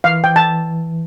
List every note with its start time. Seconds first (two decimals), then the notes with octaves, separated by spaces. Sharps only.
0.04 E3 F5
0.24 G5
0.36 A5